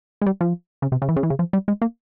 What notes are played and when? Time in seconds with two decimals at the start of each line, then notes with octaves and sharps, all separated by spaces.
0.21 G#3
0.26 G3
0.41 F3
0.82 C#3
0.92 C3
1.02 C#3
1.09 E3
1.16 C#3
1.23 E3
1.30 C#3
1.39 F3
1.53 G3
1.68 G#3
1.82 A#3